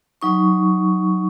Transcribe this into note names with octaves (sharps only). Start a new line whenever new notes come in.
F#3 D#4 C#6